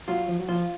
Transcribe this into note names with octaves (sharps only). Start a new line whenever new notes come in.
F#3 F4
F3
F#3
F3 F4